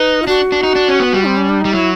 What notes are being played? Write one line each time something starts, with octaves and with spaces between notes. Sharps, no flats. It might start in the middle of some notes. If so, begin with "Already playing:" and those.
Already playing: D#4 B4
F4
D4 F#4
D4
D#4
D4
C#4
B3
G3
C4
C#4
D4
G3 D#4
F#3 E4